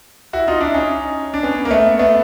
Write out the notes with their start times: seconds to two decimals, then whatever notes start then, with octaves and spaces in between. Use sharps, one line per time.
0.33 E4 F#4
0.48 D#4 F4
0.61 D4 E4
0.74 C#4 D#4
1.34 D4
1.43 B3 C#4
1.65 A#3
1.71 A3 B3
1.99 A3 B3